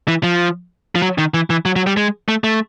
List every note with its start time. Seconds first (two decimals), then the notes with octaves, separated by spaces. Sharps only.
0.08 E3
0.23 F3
0.95 F3
1.02 F#3
1.18 D#3
1.34 E3
1.50 E3
1.65 F#3
1.76 F#3
1.87 G3
1.97 G#3
2.28 A3
2.44 A3